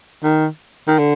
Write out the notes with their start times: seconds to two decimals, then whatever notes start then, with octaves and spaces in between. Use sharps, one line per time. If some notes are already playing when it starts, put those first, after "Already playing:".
0.24 D#3
0.88 D#3
0.99 D3